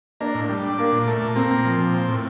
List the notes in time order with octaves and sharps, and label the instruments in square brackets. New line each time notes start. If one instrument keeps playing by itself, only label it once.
[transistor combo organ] A#3 [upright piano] D4
[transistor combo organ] A2
G3
D4
[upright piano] A#3 [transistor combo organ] D4
[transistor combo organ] A#2
A3
A#2
[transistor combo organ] A#3 [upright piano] C4
[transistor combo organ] A#2
F3
A#2
C4
A2